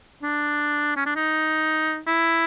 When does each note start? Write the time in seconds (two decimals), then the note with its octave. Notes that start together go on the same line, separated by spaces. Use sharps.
0.23 D4
0.96 C#4
1.06 D4
1.16 D#4
2.07 E4